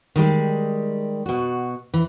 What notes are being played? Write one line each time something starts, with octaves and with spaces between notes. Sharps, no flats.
D#3 G3 G#3
B2 F#4
E3